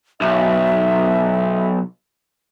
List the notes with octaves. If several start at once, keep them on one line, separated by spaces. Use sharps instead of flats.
B1 E5